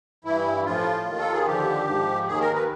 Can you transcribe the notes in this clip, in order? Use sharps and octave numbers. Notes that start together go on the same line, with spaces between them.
G2 E3 E4
A2 F3 F4
D#2 D#3
A4
G#4
D#2 D3 F3 G4
G#2 F3
D#2 D#3 G#4
A#4
B4